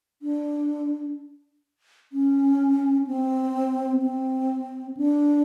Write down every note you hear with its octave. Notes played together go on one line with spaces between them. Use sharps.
D4
C#4
C4
C4
D4